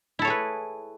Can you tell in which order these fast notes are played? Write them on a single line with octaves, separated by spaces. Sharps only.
E4 A4 C#5 G#4 B4